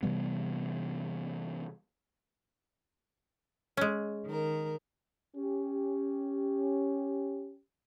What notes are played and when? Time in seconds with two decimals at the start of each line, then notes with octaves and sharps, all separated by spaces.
0.03 C3 E3 G3 B3
3.77 G#3 C#4
4.26 D#3 A#4
5.37 C#4 G4